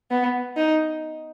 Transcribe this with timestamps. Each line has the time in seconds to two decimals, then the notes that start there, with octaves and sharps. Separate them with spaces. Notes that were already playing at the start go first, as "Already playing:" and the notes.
0.11 B3
0.57 D#4